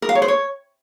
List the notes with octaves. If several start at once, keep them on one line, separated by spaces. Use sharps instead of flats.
A#4
F5
C#5
C5
C#5